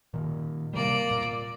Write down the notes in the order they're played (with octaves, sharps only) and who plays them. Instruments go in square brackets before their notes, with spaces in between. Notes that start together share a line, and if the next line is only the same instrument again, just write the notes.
[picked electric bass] A#2 D#3
[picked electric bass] C3 G3 [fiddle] A#3 D5
[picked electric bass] A#2